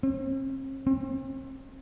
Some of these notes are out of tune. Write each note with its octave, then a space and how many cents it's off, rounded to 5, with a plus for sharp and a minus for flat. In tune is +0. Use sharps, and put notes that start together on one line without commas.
C4 +45
C4 +40